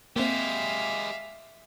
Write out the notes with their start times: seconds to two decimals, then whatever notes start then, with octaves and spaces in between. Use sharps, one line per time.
0.16 G#3 A#3 C4 G4 E5 F5